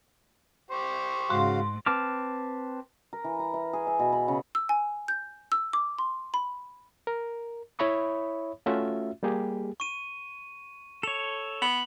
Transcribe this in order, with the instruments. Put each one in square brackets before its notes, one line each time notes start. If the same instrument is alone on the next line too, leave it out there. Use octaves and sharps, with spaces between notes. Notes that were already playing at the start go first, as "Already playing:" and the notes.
[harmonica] G4 C5 C#6
[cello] G#2 [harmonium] C#3 F#4 F5 [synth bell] C6
[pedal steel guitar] C4 B4 A5 D6 F6
[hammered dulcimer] A#4
E3
A#5
E5
G#4
E5
B2
B5
C#3
[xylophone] E6
G#5
G6
E6
D6
C6
B5
[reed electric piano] A#4
E4 C#5 E5 B5 C#6 D#6
A3 C#4 F4 F#4 E5
G3 A#3 G4 G#4
[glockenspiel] C#6 D#7
[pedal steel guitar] A4 C#5 [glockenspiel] F7
[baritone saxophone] B3 [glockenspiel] F#7